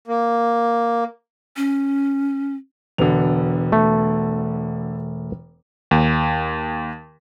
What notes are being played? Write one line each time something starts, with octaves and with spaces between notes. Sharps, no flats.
A#3
C#4
E1 D3 B3 F7
A3
D#2